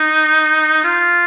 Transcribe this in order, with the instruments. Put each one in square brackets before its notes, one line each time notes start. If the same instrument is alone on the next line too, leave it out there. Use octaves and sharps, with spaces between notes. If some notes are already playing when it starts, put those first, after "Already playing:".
Already playing: [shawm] D#4
F4